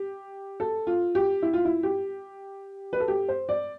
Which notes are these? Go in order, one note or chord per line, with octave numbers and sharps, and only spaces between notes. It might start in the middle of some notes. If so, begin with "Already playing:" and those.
Already playing: G4
A4
F4
G4
E4
F4
E4
G4
B4
A4
G4
C5
D5